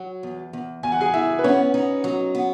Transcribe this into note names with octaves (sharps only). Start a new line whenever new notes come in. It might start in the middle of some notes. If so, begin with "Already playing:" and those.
Already playing: F#3
E2
E2
E2 G#5
F#5
G#4 G#5
E2 E4 E5
B4
B3 C#4 C#5
D#4
F#3
B3